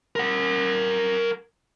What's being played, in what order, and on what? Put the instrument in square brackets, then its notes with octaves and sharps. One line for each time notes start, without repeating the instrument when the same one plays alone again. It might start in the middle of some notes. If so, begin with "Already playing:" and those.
[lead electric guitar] A#4 F#5